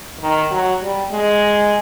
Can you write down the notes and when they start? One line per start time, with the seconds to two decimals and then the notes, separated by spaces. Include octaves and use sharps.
0.20 D#3
0.51 F#3
0.81 G3
1.11 G#3